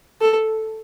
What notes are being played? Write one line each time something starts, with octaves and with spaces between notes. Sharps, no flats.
A4